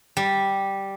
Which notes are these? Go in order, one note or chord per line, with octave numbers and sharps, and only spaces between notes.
G3